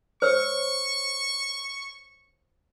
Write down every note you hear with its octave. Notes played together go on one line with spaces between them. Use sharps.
C5 C#5 C#6 E6